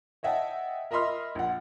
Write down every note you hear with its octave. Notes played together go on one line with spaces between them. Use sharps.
C#5 D#5 E5 F#5 G5 A5
A#4 D#5 E5 B5 C6 F6
A#1 F#5